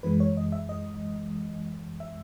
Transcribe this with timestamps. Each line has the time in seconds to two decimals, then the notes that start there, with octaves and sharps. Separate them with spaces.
0.03 F#2 E3 G#3 B4
0.20 C#5
0.37 D#5
0.52 E5
0.69 D#5
2.00 E5